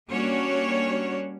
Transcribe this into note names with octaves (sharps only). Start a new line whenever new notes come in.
G3 A#3 C#4 D4 F#4 C#5